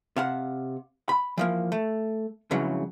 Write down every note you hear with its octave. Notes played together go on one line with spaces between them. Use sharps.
C3 F5 F#5
B5
E3 F3 A#3
A3
F2 G#2 C#3 E3 F#3